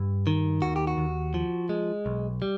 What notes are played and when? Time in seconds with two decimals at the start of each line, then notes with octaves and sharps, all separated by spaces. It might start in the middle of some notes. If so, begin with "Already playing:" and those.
Already playing: G2
0.27 D#3
0.62 D#2 F#4
0.76 G4
0.87 F#4
0.98 D#2
1.34 F3
1.69 G#3
2.06 B1
2.42 G3